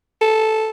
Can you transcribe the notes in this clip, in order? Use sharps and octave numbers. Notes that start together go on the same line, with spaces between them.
A4